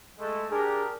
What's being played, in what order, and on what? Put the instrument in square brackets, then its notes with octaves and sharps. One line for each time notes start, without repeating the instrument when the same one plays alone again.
[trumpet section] G#3 A3
[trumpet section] D4 G4 A#4 [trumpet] G#4